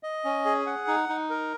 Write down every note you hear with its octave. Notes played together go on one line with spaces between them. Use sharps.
D#5
C#4
G#4
F#5
D#4
D#4
A#4